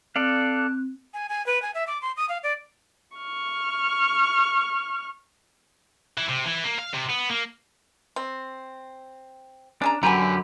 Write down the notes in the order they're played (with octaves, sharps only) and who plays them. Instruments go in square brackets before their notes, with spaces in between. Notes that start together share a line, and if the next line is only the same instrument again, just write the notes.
[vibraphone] C4 [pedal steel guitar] A4 D5 F5 [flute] F#6
[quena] G#5
G#5
B4
G#5
E5
D6
C6
D#6
F5
D5
[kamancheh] C#6 F6
[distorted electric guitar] E3
C3
E3
A#3
F5
C3
B3
A#3
[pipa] C4
[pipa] C#4 G#4 A#5 [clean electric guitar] D4
[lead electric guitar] F#2 [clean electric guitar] D3 G4 B4 [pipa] G#5 A#5